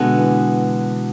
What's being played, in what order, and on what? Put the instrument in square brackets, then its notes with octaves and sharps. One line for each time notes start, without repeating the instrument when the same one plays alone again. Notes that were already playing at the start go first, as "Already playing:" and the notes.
Already playing: [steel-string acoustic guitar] B2 G#3 B3 F#4 A4 [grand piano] D3
[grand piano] E3